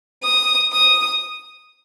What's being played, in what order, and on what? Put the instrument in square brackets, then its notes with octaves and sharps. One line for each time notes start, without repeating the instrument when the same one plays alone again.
[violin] D#6
D#6